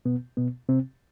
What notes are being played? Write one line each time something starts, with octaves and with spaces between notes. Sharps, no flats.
B2 B3
B2 B3
C3 C4